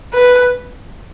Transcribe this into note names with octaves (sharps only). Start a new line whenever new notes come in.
B4